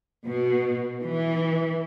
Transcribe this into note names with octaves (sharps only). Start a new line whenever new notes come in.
B2
E3